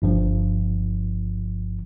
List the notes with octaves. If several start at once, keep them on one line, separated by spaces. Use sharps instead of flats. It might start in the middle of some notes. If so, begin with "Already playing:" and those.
G1 G2 F3